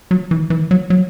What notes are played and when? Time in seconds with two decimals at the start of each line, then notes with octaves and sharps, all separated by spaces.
0.11 F#3
0.31 E3
0.50 E3
0.71 F#3
0.90 F#3